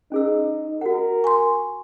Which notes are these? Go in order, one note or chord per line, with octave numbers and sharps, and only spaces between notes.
C#4 D#4 G#4 E6
F#4 A#4 F#5
G#5 C6 C#6